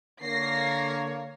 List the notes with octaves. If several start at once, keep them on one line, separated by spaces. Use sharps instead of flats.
D3 A#3 C#5 A#6 C7